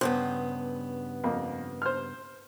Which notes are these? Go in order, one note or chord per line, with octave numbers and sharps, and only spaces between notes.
G2 C#3 B3 C5
F2 A#3
C5 F6